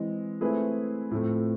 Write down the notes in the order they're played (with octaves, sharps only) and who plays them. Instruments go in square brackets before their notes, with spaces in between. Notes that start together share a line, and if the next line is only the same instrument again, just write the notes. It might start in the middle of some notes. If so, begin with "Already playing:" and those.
Already playing: [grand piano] E3 G#3 C4
A3 C4 E4 G#4 B4
A2 F3 A3 C4